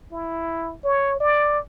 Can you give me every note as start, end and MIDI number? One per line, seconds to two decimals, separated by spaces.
0.12 0.75 64
0.84 1.19 73
1.20 1.59 74